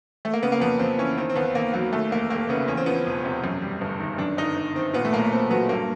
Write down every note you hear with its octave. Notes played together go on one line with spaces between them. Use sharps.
A3
A#3
C#3 B3
A#3
F2 B3
F2 C4
E3 C#4
D#3 C4
C4
D#2 B3
D#2 A#3
F#3 A#3
D#2 A3
F1 A#3
F1 A#3
C#3 B3
E2 C#4
C4
F3 B3
C4
E1
C3
F#2
G3
G1
D#3
F#2 D4
G1 D#4
G1
D#3 C4
A#2 B3
A3
B1 A#3
B1 C4
F#3 B3
G2 A#3